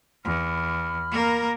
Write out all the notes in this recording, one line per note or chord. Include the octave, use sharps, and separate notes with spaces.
E2 B5 F6
A#3 A#4